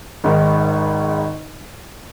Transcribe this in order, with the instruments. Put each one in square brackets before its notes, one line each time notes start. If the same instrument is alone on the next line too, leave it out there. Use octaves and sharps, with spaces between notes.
[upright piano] G#1 G#2 D#3